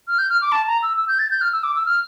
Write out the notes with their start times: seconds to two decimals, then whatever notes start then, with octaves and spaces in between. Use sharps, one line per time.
0.08 F6
0.18 G6
0.30 F6
0.42 D6
0.52 A5
0.67 A#5
0.83 E6
0.97 E6
1.08 G6
1.19 A6
1.31 G6
1.41 F6
1.53 E6
1.64 D6
1.76 E6
1.86 F6